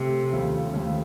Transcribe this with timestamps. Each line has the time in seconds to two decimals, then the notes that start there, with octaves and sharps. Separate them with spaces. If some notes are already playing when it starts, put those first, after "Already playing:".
Already playing: C3 A3
0.33 D#2 C#3 F3 A3
0.73 D#2 C#3 F3 A3